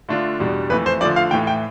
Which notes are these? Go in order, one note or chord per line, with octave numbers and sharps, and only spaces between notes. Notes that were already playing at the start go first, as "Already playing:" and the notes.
D3 A3 D4 F4
E2 B2 G3 D4
F2 E3 A3 B4
C5
D3 F3 A3 D5
F5
A2 E3 A3 G5
G5